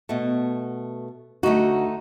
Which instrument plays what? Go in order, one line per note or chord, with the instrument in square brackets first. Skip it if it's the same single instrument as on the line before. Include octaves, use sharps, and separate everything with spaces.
[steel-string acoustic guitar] B2 A3
[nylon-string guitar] D2 F#4 [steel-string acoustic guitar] A3 D#4